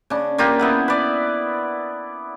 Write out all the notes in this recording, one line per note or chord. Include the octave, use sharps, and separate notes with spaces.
C#3 D4
A#3 F4 G4
B3 E4 F#5
B4 D5